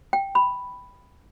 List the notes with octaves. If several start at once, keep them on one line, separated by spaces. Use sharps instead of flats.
G5
B5